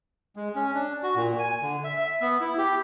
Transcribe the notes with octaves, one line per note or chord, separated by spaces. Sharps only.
G#3
C#4
D4
F#4
A#2
G#5
D3
E5
E5
B3
E4
G4